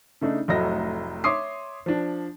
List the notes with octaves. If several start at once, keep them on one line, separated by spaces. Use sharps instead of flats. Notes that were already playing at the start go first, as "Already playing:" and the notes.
C#3 A3 D4 D#4
F1 A2 F#3 D#5 A#6
C#5 E5 C6 D6 D#6 C7
F3 D4